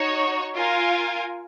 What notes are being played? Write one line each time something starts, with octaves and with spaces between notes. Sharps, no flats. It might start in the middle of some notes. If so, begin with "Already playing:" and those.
Already playing: D#4 F#4 C#5
F4 A#4 F5 G#5